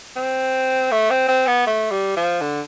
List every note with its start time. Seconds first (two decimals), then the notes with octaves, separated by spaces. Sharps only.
0.16 C4
0.92 A3
1.10 C4
1.28 C4
1.47 B3
1.67 A3
1.91 G3
2.16 F3
2.41 D3